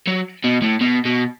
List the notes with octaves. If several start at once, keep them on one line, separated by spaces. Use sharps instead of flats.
F#3
B2
A2
B2
B2